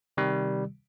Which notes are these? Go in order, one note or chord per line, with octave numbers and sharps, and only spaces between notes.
C3 D#3 G3